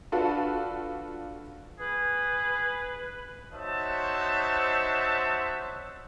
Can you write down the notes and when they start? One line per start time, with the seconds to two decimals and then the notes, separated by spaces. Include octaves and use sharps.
0.12 D4 F4 F#4 A4 B4
1.79 G#4 B4
3.53 D#4 F#4 C5 C#5 E5 A5